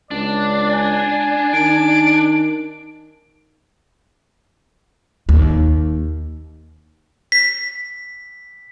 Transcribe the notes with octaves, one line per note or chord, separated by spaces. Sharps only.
C#2 D4 D5
G#5
D#3 D7
D#2
B6